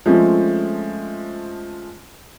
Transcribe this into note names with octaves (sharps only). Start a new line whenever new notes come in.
F3 G#3 A3 C4 C#4